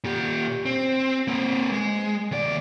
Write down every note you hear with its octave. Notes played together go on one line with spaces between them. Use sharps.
A#2 G4
C4
A#3 C4
G#3
D#2 D5